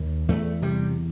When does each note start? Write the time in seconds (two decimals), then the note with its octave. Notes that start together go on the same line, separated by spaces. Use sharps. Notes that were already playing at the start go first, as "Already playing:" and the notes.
Already playing: D#2
0.28 E2 A3
0.62 C3 G3